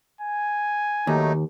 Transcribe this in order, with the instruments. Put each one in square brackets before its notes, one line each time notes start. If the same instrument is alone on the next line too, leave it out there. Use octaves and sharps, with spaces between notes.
[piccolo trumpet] G#5
[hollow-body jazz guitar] D#2 [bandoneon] F#3 A3 D#4